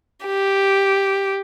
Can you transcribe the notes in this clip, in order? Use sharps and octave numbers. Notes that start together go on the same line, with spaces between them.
G4